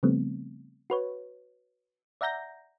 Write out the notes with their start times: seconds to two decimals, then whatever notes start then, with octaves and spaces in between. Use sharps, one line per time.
0.03 C#3 F3 G3 A3 B3 C4
0.90 F#4 B4 C#5
2.21 D5 E5 F#5 A#5 G6 A#6